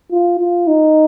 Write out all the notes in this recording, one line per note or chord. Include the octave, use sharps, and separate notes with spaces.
F4
F4
D#4